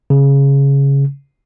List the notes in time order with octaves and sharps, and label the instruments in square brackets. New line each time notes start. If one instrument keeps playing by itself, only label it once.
[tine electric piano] C#3